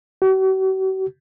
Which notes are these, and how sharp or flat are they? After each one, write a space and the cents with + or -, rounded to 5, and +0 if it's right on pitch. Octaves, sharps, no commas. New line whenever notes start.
F#4 +45